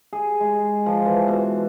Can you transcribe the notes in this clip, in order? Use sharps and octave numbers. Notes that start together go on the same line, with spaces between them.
G#4
G#3
F3
E3
B2